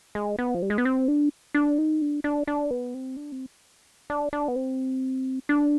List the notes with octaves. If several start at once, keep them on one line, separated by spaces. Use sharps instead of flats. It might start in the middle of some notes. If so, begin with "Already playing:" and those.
G#3
B3
F3
G3
G#3
B3
C4
D4
D4
D#4
D4
D4
D4
B3
C4
D4
C4
D4
D4
B3
C4
D4